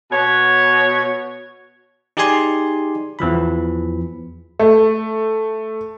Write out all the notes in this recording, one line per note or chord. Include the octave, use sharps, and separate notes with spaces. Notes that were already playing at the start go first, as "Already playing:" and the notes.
B2 C#5
D#4 G4 G#4 D5 G#5 C6
E2 E3 F3 B5
A3